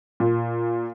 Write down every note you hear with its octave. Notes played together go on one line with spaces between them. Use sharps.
A#2